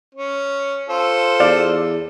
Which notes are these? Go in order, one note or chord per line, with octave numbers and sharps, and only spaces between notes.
C#4
F4 A4 C5
E2 D5 F5